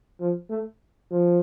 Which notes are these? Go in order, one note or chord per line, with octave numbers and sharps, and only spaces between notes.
F3
A3
F3